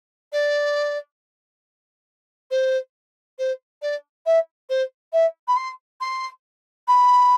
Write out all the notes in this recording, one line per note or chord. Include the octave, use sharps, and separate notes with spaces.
D5
C5
C5
D5
E5
C5
E5
B5
C6
C6
B5